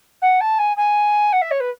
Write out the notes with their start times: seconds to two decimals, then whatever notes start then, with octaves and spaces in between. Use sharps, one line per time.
0.22 F#5
0.41 A5
0.59 G#5
0.77 G#5
1.33 F#5
1.42 E5
1.51 C#5
1.60 B4